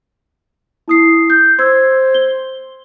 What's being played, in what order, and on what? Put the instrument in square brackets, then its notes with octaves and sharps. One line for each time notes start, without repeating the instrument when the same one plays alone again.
[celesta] E4 D#6 C7
G6
[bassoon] C5 [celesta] E6 G#6
[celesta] G7